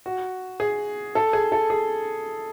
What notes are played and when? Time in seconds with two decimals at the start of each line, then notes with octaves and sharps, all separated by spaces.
0.06 F#4
0.60 G#4
1.15 A4
1.33 G#4
1.52 A4
1.70 G#4